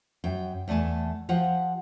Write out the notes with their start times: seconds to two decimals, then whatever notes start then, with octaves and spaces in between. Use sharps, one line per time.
0.24 F#2 G5
0.68 E2 A3 D5 G#5 A5
1.29 F3 G4 F#5